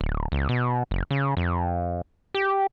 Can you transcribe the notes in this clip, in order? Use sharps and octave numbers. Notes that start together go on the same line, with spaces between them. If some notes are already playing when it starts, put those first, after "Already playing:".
D1
C#2
B2
F#1
C#3
F2
G4